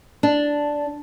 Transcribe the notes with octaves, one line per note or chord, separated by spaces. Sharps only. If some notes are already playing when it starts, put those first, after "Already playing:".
D4